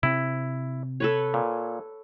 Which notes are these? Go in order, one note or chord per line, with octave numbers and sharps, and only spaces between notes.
C3 C4 E4
A4 B4 C#5
A#2